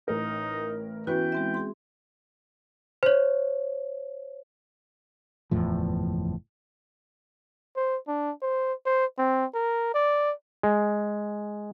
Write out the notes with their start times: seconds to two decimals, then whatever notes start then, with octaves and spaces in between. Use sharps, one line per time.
0.08 A1 D#4 A#4
1.07 E3 B3 C#4 F#4 B4 G5
1.32 G#3 C4 E5
1.54 G#4 C6
3.03 C5 C#5
5.51 F#1 E2 A2 F3
7.76 C5
8.08 D4
8.42 C5
8.85 C5
9.18 C4
9.54 A#4
9.94 D5
10.63 G#3